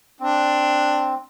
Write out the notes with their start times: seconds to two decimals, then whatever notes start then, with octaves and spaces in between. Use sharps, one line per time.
0.21 C4 D4